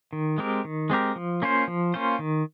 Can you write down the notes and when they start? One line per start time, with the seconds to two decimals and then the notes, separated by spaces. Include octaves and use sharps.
0.13 D#3
0.38 G#3 C4 G4 A#4
0.65 D#3
0.90 G#3 C4 G4 A#4
1.16 F3
1.42 A#3 C#4 F4 C5
1.68 F3
1.94 A#3 C#4 F4 C5
2.19 D#3